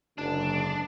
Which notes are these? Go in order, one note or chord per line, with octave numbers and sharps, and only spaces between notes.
F#1 G#2 D3 D4